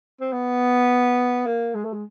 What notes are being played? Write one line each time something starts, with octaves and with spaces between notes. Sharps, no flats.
C4
B3
A#3
G#3
A3
G#3